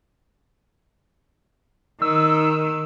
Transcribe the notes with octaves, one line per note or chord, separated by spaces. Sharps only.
D#3 E6